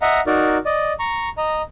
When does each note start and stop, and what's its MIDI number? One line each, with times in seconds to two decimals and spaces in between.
0.02 0.20 75
0.02 0.20 76
0.02 0.20 78
0.02 0.20 82
0.27 0.58 63
0.27 0.58 66
0.27 0.58 70
0.27 0.58 74
0.65 0.93 74
0.65 0.93 75
0.99 1.29 82
0.99 1.29 85
1.38 1.62 75
1.38 1.62 82